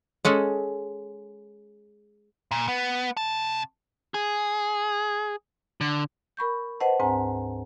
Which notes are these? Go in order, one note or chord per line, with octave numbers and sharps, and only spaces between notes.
G#3 C#4 G#4 A4
A#2
B3
C3 A5
G#4
D3
A#4 B5 C#6 G6
B4 C5 D#5 F#5 A5
D2 G#2 C4 G#5 A#5